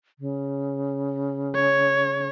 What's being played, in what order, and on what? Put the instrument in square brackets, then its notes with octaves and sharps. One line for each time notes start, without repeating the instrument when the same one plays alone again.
[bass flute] C#3
[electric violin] C#5